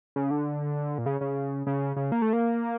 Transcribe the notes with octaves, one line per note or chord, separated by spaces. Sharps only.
C#3
D3
A#2
C#3
C#3
C#3
C#3
A#3
A3
A#3